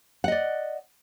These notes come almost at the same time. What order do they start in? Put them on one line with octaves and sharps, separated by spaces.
F#5 D#5 D5